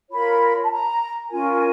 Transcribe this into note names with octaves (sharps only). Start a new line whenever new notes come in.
F4 A#4 C#5 B5
A5
A#5
C#4 F4 A#4 G#5